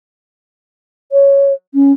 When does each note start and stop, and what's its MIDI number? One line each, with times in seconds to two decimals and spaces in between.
1.12 1.53 73
1.75 1.92 61